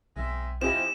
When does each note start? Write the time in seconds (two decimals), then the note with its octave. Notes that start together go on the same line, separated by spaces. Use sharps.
0.16 B1 G#3 C4 E5
0.61 F3 C4 E4 G4 D#5 G#5 E7